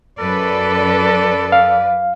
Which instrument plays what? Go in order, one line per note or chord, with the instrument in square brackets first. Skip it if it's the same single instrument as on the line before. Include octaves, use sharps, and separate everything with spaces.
[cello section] F#2 B4 D5 [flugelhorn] A4
[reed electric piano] F5